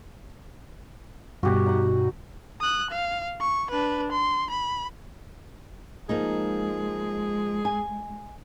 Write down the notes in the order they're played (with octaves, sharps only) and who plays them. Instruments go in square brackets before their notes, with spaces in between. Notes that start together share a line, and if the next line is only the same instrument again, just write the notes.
[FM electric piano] G2 B2 [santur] F#4 G4 F#5
[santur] D#4 F#5
[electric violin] D#6 F#6
F5
C#6
D4 B4
C6
B5
[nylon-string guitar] F3 A#3 D#4 [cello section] G#3 [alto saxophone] G#4
[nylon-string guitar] G#5